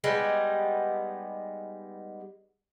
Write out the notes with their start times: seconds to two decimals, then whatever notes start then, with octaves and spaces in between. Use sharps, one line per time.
0.04 G3 G#3 B3 D#4